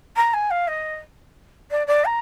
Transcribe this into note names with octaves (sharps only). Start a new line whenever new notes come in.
A#5
G#5
F5
D#5
D5
D5
A#5